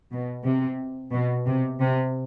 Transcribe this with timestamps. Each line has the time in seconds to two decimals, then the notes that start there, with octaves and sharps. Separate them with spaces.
0.11 B2
0.44 C3
1.12 B2
1.46 C3
1.80 C3